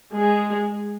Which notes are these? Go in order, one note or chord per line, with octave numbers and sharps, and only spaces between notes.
G#3 G#4